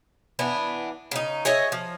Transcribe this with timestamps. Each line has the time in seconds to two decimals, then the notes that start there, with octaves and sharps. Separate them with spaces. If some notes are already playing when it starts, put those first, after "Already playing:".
0.39 E3 B3 D4
1.11 C#3 D#4
1.45 G#4 C#5 D#5 E5
1.72 F3